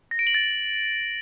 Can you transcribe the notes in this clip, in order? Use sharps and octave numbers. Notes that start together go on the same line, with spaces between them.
A#6
D7
F#7
A6